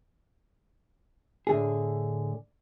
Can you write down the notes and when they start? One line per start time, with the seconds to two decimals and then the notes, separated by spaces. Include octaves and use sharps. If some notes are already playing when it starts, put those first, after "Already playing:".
1.47 A2 D3 G#4